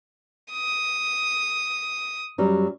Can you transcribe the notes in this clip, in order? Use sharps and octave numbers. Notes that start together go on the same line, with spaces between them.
D#6
F#2 F#3 G3